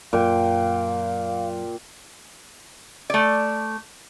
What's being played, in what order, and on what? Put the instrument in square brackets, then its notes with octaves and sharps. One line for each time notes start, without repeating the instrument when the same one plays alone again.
[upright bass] F#2 [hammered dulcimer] A#2 G5 [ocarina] F5
[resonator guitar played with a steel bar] A3 D5